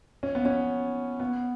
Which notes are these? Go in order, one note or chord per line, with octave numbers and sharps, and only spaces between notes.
C#4
B3
C#4
B3